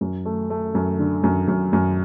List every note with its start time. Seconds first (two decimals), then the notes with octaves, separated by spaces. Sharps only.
0.01 F#2
0.25 A3
0.50 A3
0.75 F#2
0.99 D3
1.24 F#2
1.48 F#2
1.73 F#2